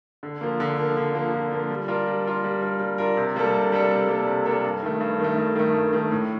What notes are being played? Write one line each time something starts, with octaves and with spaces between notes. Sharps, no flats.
D3
F3 A#3
D3
F3 A#3
D3
F3 A#3
D3
F3 A#3
G3
D4 F4 A#4
G3
D4 F4 A#4
G3
D4 F4 A#4
G3
D4 F4 A#4
C3
G3 A#3 D4 A4
C3
G3 A#3 D4 A4
C3
G3 A#3 D4 A4
C3
G3 A#3 D4 A4
G2
D#3 A3
G2
D#3 A3
G2
D#3 A3
G2
D#3 A3
A2